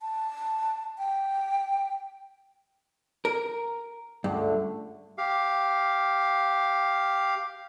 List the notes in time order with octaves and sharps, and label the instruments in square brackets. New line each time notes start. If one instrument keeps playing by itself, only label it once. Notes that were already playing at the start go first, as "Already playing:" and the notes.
[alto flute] A5
G5
[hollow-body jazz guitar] A#4
[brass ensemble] C#2 D3 A3 [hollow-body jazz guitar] G2
[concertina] G4 F5